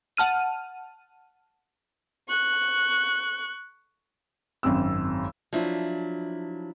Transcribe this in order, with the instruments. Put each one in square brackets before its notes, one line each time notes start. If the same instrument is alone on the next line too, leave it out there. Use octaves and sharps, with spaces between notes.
[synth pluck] F#5 A5 F6 D#7
[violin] C#6 F#6
[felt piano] G#1 F#2 C4 E6
[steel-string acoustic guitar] F3 F#3 D4 E4